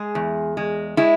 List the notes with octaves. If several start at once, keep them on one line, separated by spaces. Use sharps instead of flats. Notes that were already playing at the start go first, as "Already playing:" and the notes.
Already playing: G#3 G#4
E2
G#3
G#3 E4